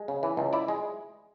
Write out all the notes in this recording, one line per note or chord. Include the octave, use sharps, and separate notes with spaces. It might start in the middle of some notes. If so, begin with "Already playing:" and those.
Already playing: G#3
C#3
E3
C#2
E4 D5
G#3